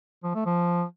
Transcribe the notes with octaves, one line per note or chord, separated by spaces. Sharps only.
F3
A3
F3